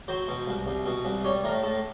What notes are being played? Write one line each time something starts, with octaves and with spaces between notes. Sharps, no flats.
F#3 C5
B2
C2
C2
B2
C2
G3 C#5
A2 A#4
A2 A4